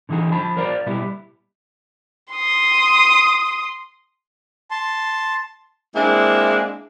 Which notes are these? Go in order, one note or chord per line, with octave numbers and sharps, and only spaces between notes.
D3 E3 D#4 F#4 G#4
F3 A5 B5
A#4 C5 D5 F5
B2 G3 B3 E4
C6 D#6
A5 C6
G#3 A#3 C4 D4 E4